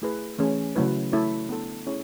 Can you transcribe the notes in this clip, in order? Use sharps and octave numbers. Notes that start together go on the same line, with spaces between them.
A3 E4 G#4 B4
E3 A3 C#4 G#4
C#3 F#3 A3 E4 B4
A3 E4 A4 C#5
B3 D4 A4
A3 C#4 E4 G#4 C#5